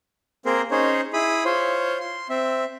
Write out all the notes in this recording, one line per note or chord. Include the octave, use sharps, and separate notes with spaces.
A#3 C4 G#4 A#4 C5
C#4 D#4 G#4 C5 C#5
E4 G#4 B5 D#6
F4 C5 C#5
C6
C4 E5